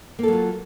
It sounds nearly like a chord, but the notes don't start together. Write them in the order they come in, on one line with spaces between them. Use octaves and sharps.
A#3 A4 F#3 F4